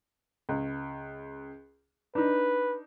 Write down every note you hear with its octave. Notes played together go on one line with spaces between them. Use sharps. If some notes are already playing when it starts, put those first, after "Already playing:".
C#2
D4 D#4 B4